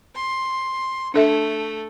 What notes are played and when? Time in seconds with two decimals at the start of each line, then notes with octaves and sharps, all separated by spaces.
0.15 C6
1.14 A3 D4 A4 E5